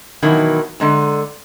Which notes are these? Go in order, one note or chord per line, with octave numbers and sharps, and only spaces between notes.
B2 D#3 E3 F#3
D3 G#3 A#5